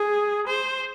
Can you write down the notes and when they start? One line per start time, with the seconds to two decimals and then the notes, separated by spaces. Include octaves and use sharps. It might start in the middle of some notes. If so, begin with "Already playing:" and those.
Already playing: G#4
0.47 C5